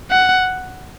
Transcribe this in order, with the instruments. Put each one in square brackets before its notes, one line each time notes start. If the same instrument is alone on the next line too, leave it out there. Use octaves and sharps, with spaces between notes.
[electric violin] F#5